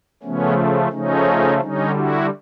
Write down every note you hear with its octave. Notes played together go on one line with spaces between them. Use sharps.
C#3 F3 A3 B3 C#4
C#3 F3 A3 C#4 D#4
D3 G3 C#4 D#4
E4 F#4